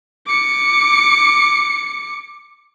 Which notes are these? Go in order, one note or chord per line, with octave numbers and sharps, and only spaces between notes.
D6 C#7